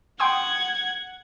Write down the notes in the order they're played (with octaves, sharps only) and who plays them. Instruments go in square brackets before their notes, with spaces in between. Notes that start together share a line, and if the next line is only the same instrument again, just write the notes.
[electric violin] F#5 G#6 [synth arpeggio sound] G5 C6 D#6